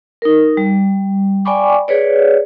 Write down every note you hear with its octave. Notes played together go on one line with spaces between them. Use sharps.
D#4 A#4
G3
D5 G5 G#5 B5 C#6 D6
G#4 B4 C#5 D5